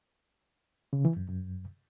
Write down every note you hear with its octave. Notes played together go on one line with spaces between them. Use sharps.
C#3
E3
F#2
F#2